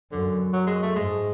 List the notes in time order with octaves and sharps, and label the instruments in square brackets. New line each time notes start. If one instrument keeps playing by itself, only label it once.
[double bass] F#2 [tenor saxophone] D3
[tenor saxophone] F#3
G#3
A3
[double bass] G#2 [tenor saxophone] G#3